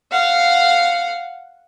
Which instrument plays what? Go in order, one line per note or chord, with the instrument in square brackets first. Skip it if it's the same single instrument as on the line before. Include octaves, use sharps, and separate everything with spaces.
[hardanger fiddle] F5 F#5